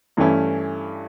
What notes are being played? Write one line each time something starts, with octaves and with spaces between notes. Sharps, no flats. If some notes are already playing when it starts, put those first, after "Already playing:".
G2 E3 A3 C#4 E4